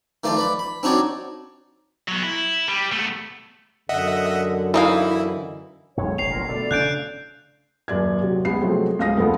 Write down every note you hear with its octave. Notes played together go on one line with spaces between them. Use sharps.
D#3 F3 A3 C5 D5
B4 D5 B5
B5
C4 D4 D#4 F#4 C#5 D5
F#3 B3
E4
G3
A3 B3
F#2 D3 D#5 E5 F#5
E3 D#4 E4 F5
B1 F2 G#3 C#5
F1 A#1 F#2 C7 F7
B3 F4 A#4
B2 D3 A3 A4 D5
C#3 C#4 D4 F#6 G6 D7
D#1 F#2 D5 G#6
C3 F#3
C#2 G3 B3 C7
C3 F3 F#3 G#3 A3 C4
C#2 G#2 F5 D#6 A#6
F1 D2 F3 B3 A4